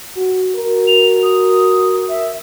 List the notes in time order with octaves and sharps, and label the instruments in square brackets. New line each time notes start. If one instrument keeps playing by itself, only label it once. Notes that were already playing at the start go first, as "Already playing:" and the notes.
[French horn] F#4
[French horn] F#4 [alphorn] A#4
[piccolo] F7
D#6
E5